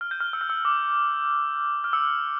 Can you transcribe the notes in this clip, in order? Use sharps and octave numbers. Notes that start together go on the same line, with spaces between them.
F6
G6
F6
E6
F6
E6
D6
F6
E6